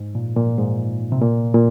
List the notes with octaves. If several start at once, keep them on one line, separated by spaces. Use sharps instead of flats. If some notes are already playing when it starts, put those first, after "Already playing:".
Already playing: G#2
A#2
A#2
G#2
C3
A#2
A#2